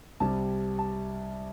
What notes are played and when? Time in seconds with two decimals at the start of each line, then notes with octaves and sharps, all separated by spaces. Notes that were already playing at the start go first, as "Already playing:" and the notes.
0.20 C2 C3 G3 A5
0.79 A5